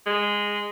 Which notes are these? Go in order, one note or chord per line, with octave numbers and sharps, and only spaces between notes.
G#3